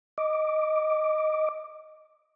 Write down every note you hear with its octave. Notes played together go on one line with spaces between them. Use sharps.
D#5 D6